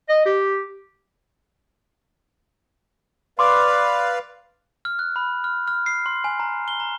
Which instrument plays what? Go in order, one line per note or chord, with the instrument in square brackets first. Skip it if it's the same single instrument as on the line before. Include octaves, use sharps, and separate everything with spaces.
[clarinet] D#5
G4
[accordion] B4 D5 F5 [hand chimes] C6 D6
[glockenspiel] F6
F#6
B5
F6
F6
C7
C6
G#5
A#5
G7
A#5